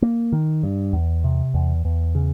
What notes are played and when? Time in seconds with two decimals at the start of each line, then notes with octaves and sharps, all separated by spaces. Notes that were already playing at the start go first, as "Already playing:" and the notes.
0.02 A#3
0.32 D#3
0.63 G2
0.93 E2
1.24 C3
1.54 E2
1.85 E2
2.15 C#3